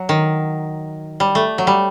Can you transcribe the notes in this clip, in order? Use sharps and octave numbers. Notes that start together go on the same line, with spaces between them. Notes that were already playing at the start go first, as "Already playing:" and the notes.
Already playing: F#3
D#3
G3
A3
F#3
G3